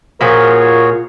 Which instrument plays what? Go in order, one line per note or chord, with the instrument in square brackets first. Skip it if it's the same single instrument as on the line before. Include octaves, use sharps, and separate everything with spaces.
[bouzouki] A#2 F3 [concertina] F#4 G#4 C#5 [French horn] A#4